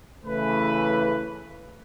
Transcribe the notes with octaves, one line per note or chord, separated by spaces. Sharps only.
C#3 E3 A3 B4